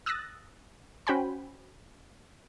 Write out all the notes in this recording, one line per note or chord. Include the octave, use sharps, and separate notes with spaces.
D#6 E6 F#6 A6 A#6
C#4 F#4 C5 G5 G#5 B5